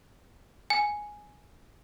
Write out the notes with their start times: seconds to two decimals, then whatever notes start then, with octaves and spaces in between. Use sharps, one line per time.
0.70 G#5